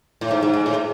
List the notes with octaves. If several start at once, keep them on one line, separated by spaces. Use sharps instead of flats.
A2
G#2
G#2
G#2
A2